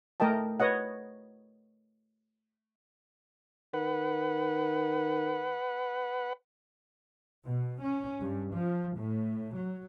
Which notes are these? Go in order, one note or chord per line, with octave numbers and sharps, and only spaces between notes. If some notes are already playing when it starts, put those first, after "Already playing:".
A3 A#4 D#5 G5 A5
B4 C#5 D#5 F#5
D#3 B4 F#5
B2
C#4
G2
F3
A2
F#3